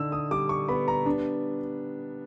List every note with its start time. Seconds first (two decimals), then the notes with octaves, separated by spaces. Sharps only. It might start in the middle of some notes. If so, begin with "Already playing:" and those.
Already playing: D3 D#4 E6
0.12 D#6
0.31 G3 D6
0.49 C#6
0.69 B3 B5
0.88 A#5
1.06 D4